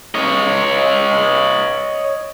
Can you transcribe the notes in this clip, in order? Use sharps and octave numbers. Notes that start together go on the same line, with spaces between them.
C#5 D#5